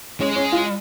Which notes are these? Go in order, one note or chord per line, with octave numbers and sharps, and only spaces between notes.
G#3 C#4
C#4
F4